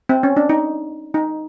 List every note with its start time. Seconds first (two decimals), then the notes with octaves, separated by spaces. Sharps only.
0.09 C4
0.23 C#4
0.37 D4
0.49 D#4
1.14 D#4